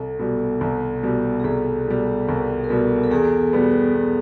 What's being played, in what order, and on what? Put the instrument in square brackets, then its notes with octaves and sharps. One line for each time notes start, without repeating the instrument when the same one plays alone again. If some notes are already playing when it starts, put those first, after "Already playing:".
Already playing: [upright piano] C2 [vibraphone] A4
[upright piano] B2 G3
C2
B2 G3
[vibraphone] G#4
[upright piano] C2 [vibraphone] A4
[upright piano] B2 G3
[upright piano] C2 [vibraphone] A#4
[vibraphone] A#4
[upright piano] B2 G3 [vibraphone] A4
[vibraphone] A4
[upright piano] E2 [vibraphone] G#4
[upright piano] B2 G3 B3
E2